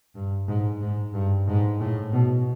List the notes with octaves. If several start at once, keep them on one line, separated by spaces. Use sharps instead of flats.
G2
G#2
G#2
G2
G#2
A2
B2